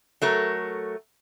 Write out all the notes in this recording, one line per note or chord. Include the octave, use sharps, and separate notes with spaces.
F#3 A3 A#4